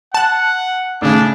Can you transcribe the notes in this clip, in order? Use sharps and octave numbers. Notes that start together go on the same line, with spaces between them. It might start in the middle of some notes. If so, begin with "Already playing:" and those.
F#5 A5 F#6
A2 C#3 D4